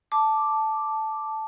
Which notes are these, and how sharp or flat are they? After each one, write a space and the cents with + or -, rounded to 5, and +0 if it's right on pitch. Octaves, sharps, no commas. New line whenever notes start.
A5 -5 D6 +0